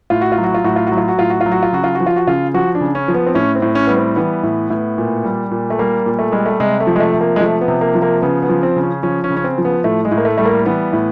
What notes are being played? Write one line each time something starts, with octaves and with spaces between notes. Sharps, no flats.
A2 F4
F#4
F4
F#3
F#4
F4
A2 F#4
F4
F#3 F#4
F4
F#4
A2 F4
F#4
F4
F#3
F#4
F4
C#3 F#4
F4
F#4
F3
F4
F#4
C#3 F4
F3 F#4
D4
C#3
C#4
F3
B3
C4
A2 C#4
C4
A2
C#4
G3 B3
C4
E3 B3
A2
A2
A#2
G3
A#2
A3
G3 A#3
A#2
A3
G3 G#3
A3
C3 G#3
A3
F3
G#3
A3
C3
A#3
G#3
F3 A3
B3
C3
A#3
F3
A#3
C#3 B3
B3
F3
C4
C#3
C#4
F3 C#4
C#4
C#3
C#4
C4
F3
B3
A2 A3
G#3
A2
A#3
A3
G3 A3
A#3
E3 B3
A2